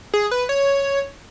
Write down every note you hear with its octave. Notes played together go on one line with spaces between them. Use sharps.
G#4
B4
C#5